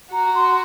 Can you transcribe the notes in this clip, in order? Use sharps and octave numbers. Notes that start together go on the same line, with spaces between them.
F#4 A#5
C6